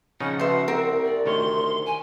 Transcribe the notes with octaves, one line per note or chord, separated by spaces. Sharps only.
C#3 F3 D#4 F#5
B2 E5 C6
C2 C4 A#4
D5
D2 D#3 C#5 C6
G#5